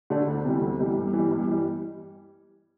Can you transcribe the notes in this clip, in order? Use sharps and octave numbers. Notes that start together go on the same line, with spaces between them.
D3 A3 D4
D2
C3 E3 G3
D2
C3 E3 G3
G2
E3
G3
G2
E3 G3